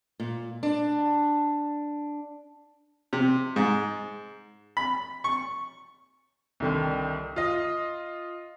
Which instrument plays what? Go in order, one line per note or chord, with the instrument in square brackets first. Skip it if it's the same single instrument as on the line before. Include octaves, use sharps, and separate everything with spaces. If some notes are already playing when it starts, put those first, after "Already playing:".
[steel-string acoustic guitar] A#2
D4
[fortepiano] C3
G#2
B5
C#6
[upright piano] C2 D3 D#3
F4 D#5